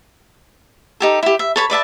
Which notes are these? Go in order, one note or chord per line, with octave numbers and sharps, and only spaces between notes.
D#4 G4 A4
E4 G4
E5
A4 C#5 B5
B4 D5 E5 A5